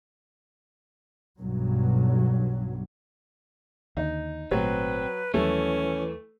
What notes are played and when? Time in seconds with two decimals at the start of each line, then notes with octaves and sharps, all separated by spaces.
1.40 B1 G2 F#3
3.97 D#2 D3 D#4
4.51 G#1 A#2 F#3 A3 C4 B4
5.34 D#2 E3 F#3 G3 A3 C#4